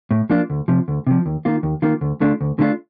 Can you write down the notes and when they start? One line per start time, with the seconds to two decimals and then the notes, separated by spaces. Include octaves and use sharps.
0.11 A2
0.30 F3 A#3 D4 F4
0.50 D2
0.68 C3 F3
0.88 D2
1.07 C3 F3
1.26 D#2
1.45 D#3 A#3 F4
1.63 D#2
1.82 D#3 A#3 F4
2.01 D2
2.21 D3 A3 D4 F4
2.41 D2
2.59 D3 A3 D4 F4